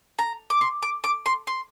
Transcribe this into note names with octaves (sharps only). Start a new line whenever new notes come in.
A#5
D6
C6
D6
D6
C6
C6